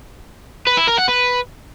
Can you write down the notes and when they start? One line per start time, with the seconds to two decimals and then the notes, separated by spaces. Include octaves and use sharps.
0.67 B4
0.77 E4
0.87 A#4
0.98 F#5
1.08 B4